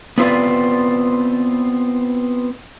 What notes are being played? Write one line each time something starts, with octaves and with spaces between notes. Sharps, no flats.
B3 C4 F4 B4 D5